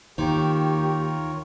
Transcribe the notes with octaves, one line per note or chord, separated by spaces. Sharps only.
D#2 D#3 F4 G4 A#4 C#5